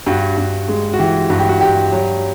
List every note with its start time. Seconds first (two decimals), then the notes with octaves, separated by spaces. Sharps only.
0.06 G2 F#4
0.37 G2
0.68 G#3
0.93 F#4
0.99 E3 G4
1.30 G2 F#4
1.39 G4
1.49 F#4
1.61 G2 G4
1.92 F#3